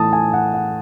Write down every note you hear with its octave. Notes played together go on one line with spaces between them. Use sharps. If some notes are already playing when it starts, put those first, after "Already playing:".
Already playing: A2 E3 A5 D#6
G#5
F#5
F#5